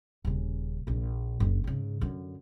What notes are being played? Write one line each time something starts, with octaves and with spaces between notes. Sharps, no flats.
D#1 C#3
A#1 A#2
F#1 D2
G#2 C#3
F#2 D3